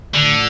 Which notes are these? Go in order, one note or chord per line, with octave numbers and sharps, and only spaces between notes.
A2 D3 F3 A3 D4